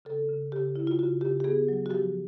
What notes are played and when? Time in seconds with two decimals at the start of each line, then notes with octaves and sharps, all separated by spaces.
0.05 C#3 A4
0.29 C#3
0.52 C#3 G4
0.75 C#3 E4
0.87 F4
0.99 C#3 F#4
1.21 C#3 G4
1.40 G4
1.44 B3 G#4
1.68 F#3
1.86 F#4
1.90 F3 G4